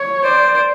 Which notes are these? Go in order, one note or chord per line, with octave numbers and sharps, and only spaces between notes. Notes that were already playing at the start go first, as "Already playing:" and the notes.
Already playing: C#5
C5 D5